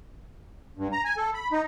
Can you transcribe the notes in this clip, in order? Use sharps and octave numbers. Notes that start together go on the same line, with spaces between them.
G2
A#5
G#5
A4
B5
D#4